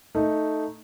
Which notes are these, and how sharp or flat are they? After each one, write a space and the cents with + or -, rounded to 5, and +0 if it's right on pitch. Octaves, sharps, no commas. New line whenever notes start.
A3 +0 D#4 +0